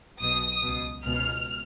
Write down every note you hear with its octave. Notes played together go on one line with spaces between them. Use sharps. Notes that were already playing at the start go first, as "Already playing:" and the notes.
B1 B2 D#6
C#2 B2
C#2 B2 F6